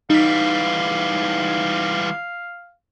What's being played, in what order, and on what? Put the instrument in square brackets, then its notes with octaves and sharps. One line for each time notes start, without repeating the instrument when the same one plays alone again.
[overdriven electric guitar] E3 G3 [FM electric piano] D#4 B6 [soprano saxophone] F5